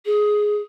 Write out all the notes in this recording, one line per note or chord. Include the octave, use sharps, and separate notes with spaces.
G#4